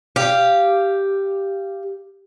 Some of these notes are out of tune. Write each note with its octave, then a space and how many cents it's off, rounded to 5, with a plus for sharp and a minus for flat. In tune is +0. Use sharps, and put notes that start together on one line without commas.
G4 +0 F5 -15